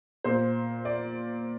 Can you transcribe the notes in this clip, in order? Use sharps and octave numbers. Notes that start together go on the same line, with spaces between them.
A#2 C5
D5